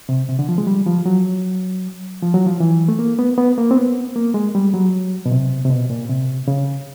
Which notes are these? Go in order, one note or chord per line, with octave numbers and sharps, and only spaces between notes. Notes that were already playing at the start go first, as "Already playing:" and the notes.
C3
C3
D3
F3
G#3
G3
F3
F#3
F3
F#3
F3
E3
A3
A#3
B3
B3
A#3
C4
B3
A#3
G#3
G3
F#3
B2
C3
C3
B2
A#2
C3
C#3